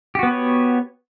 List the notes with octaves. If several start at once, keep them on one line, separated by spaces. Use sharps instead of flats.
B3 F#4 G4 B4 C#5